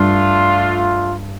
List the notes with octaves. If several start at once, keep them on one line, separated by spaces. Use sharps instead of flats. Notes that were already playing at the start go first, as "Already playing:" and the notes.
Already playing: G2 A3 D4 F4